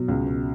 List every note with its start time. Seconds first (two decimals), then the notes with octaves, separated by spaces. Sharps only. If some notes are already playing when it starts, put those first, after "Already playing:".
Already playing: B2 F#3
0.08 C#2
0.27 B2